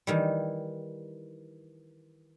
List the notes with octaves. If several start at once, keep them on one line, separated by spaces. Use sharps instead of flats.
D#3 E3 G3